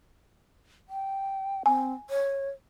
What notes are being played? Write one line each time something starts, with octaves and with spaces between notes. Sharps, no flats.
G5
C4 G#5
C#5